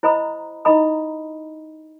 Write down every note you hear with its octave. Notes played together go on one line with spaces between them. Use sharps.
E4 C5 D#5 A#5 B5 D#6
D#4 E4 D#5 A#5 B5 D#6